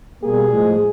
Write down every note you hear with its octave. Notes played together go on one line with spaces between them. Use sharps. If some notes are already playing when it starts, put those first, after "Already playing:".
B2 G3 A#3 G#4
A2 F3 G#3